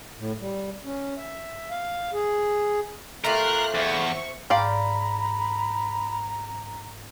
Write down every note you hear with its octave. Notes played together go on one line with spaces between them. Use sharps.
A2
G3
C#4
E5
F5
G#4
A3 F4 G4 A#4 F6 F#6 C7
E2 C5 E5 C#6
G#2 D5 F5 G5 A#5 B5